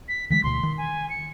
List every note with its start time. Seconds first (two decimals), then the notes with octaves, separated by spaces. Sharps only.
0.08 B6
0.30 D3 E3 G#3 B6
0.44 D2 B2 C6
0.63 D#3
0.78 G#5
1.10 C#7